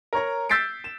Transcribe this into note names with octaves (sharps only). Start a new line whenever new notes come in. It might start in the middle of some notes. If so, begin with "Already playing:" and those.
A#4 C#5 A#5
E6 G6 A6 B6 C7 D7
E7